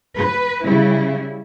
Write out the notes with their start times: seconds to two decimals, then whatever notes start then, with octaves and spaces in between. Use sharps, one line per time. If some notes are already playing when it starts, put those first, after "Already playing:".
0.16 B4
0.64 C#3 G3 E4